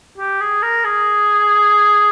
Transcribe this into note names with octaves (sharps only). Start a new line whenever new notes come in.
G4
G#4
A#4
G#4